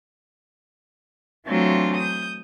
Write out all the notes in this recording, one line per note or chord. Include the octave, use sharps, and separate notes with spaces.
E3 F#3 A3 C4 D4 F4
D#6 G6